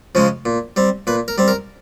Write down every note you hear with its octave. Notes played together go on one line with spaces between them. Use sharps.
C#3 F3 G#3 C#4
A#2
G3 C4
A#2 B4
A#4
G3 C4
A#4